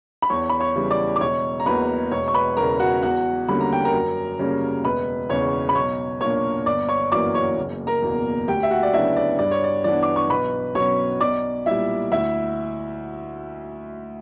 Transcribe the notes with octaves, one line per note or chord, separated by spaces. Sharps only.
B5
E2 C#5 C#6
B5
C#5 C#6
C#3 E3 G3
D5 D6
D6
E1 C#5 C#6
A#5
E2 B2 A#3 B4 B5
E1 C#5 C#6
C#6
B4 B5
E2 C#3 A#4 A#5
F#4 F#5
E2 F#4 F#5
D3 G3 A#3 C#4 B5
A#5
G5
A#4 A#5
F#2
C#3 G3 A#3 C#4
E1 B4 B5
E2 C#3 C#5 C#6
B5
B1 C#5 C#6
A#2 A#3 D4 C#5 C#6
G1 D5 D6
C#5 C#6
F#2 E3 A#3 D5 D6
C#5 C#6
F#1
A#4 A#5
E2 B2 A#3
D2 G4 G5
E5
F#4 F#5
D5
C#3 F#3 B3 D4 E4 E5
D5
G2 D5
C#5
D5
E3 B3 D4 D5
D6
C#6
B1 B4 B5
B2 F#3 C#4 C#5 C#6
B1 D5 D6
A#2 G3 E4 E5
D2 E4 E5